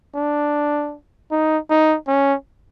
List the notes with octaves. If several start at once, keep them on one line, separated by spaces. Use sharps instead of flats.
D4
D#4
D#4
C#4